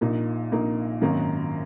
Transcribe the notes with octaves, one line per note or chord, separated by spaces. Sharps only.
A#1 A#2 A#3 D#4
A#1 A#2 A#3 D#4
G#1 F#2 D#3 A#3 D#4